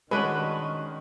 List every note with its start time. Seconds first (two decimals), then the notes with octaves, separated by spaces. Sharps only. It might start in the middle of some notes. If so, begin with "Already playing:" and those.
0.11 D#3 G#3 C#4 D4 F#4 B4